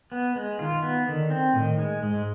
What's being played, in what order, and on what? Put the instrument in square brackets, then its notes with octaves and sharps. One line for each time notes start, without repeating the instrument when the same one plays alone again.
[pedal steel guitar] B3
G#3
[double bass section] D#3 [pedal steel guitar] F4
[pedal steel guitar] B3
[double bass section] D3 [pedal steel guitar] D#3
[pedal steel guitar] C4
[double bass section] A2 [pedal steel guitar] D#3
[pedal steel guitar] G#3
[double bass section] G#2 [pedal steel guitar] G#3